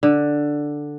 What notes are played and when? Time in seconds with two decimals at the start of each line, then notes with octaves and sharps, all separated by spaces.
0.03 D3